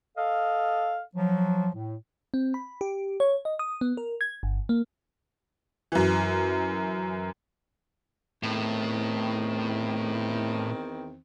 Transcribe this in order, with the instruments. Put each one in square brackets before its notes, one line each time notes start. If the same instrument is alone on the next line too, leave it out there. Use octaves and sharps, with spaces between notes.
[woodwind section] A4 D#5 F5
F3 F#3
A2
[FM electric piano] C4
B5
G4
C#5
D#5
D#6
B3
A#4
G#6
G1
A#3
[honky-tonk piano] F#2 E3
[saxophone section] E2 D#3 C4 [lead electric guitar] A2